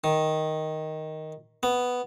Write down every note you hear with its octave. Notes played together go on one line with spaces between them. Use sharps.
D#3
B3